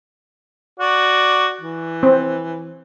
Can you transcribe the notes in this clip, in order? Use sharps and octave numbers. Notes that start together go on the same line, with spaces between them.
F#4 D5
E3
C4